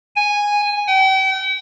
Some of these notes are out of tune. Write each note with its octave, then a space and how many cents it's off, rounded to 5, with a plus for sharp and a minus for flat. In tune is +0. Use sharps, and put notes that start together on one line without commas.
G#5 -10
G5 -40